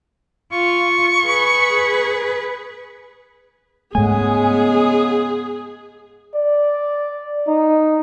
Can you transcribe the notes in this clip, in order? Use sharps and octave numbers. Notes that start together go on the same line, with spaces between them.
F4 C#6
G#4 B4
G#2 C#3 G#3 A3 B3 G#4 G#5
D5
D#4